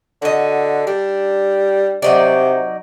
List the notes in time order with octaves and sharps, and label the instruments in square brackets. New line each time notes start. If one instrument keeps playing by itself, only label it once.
[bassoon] D3 [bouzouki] F#4 D#5
[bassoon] G3 [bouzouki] D4
[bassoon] C3 [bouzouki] F#3 D#4 D5